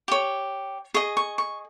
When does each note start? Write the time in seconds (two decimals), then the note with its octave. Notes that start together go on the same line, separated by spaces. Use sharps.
0.08 G4 C#5
0.94 G#4 D#5 C#6
1.17 C#6
1.38 C#6